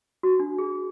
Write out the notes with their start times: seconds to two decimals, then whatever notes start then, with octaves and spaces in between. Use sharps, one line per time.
0.23 F#4
0.40 D4
0.59 G#4